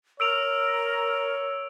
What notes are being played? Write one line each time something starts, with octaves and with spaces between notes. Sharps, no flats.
A#4 C#5 E6 D7 F7